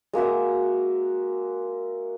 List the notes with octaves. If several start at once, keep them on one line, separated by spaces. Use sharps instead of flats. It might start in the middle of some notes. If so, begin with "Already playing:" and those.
G#3 A#3 F#4 E5